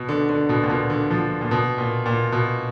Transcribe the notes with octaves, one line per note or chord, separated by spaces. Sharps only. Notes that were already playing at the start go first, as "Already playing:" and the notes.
Already playing: B2
D3
D3
B2
A#2
B2
D3
F3
A#2
B2
A#2
A#2
B2